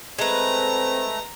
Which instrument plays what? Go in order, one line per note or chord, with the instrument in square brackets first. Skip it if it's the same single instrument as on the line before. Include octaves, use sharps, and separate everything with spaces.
[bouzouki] G#3 B4 [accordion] A3 [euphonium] C4 [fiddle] A#5